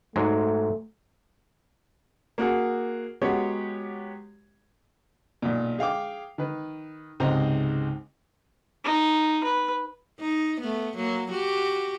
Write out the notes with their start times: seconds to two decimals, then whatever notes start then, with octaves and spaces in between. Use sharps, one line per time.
0.16 G#2 F#3 G#3 A3
2.38 A#3 F#4 G#4
3.22 F#3 G#3 B3 G4 C#5
5.42 B1 A#2
5.79 G#4 F5 G5 D6
6.38 D#3 B4
7.20 C#2 G#2 C3 D#4 C5 A#5
8.85 D#4
9.44 B4
10.20 D#4
10.60 A3 B3
10.96 F#3 A#3
11.30 F#4 G4